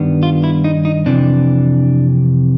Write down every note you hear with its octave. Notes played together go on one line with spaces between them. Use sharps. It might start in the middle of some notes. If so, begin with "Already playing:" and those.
Already playing: G2 D#3 G3 B3 D4
F4
E4
D#4
D#4
F2 C3 E3 D4